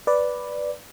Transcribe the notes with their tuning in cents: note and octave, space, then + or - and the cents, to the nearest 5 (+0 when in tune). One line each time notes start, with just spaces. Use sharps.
B4 +0 D5 +0